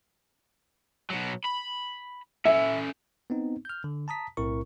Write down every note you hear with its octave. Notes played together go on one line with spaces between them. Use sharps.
B2 F#3
B5
C#4 A4 E5
B3 C4 D#4
F6 G6
D3
A5 A#5 D#6 B6
B1 A2 C4 E4 A#4 C#6